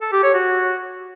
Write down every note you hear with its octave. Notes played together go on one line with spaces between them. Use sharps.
A4
G4
C#5
F#4